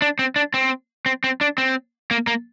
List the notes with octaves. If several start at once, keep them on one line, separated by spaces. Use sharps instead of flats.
D4
C4
D4
C4
C4
C4
D4
C4
A#3
A#3